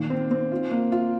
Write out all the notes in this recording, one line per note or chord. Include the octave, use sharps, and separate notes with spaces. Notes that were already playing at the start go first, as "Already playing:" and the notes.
Already playing: A#2 D#3
C4
C4
F4
A#3
F4